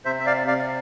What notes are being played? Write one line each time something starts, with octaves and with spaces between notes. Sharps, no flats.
C3 C5 E5
E5
D5 F5
C3 D5 F5